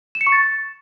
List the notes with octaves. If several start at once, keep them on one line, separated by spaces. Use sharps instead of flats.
E7
C#7
C#6
A6